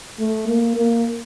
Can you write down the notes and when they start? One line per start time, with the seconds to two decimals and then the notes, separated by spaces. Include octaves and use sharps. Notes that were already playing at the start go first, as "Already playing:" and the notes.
0.19 A3
0.48 A#3
0.77 A#3